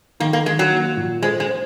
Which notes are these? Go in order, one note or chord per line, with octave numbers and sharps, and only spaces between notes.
D#3 A#3
A#3
D#3 G#3
F#3
A#3
A#2
G#3 C5
G#3
C5